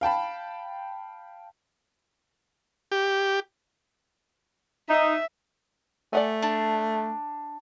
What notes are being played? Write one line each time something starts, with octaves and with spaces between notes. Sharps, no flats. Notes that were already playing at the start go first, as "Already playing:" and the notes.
F5 G5 A5 B5
G4
D#4 E5
A3 D5 F#5 G#5
D4